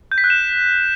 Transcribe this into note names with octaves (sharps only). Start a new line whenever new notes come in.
G6
B6
F#6
E7